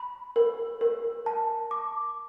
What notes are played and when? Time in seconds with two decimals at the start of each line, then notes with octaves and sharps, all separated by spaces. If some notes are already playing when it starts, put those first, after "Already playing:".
Already playing: B5
0.36 A#4
0.81 A#4
1.26 A5
1.71 D6